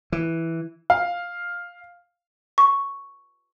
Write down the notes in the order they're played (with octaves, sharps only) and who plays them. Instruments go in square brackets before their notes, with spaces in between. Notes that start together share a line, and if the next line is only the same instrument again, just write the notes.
[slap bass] E3
[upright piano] F5
[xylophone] C#6